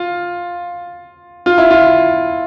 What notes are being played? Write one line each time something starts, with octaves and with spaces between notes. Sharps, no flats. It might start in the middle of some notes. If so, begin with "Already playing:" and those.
Already playing: F4
F4
E4
F4